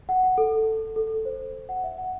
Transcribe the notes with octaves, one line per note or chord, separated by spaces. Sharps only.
F#5
F#5
A4
A4
C5
F#5
E5
F#5